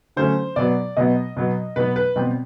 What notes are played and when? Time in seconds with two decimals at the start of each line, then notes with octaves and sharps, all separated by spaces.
0.16 D3 F#3 A3 C#4 C5
0.56 B2 F#3 B3 D5
0.97 B2 F#3 B3 D#5
1.37 B2 F#3 B3
1.76 B2 F#3 B3 B4
1.96 B4
2.16 B2 G3 C4